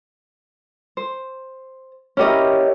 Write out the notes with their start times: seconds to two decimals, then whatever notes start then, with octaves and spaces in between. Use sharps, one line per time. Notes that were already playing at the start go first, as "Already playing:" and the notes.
0.97 C5
2.17 C#4 E4 G4 A#4 C#5 D#5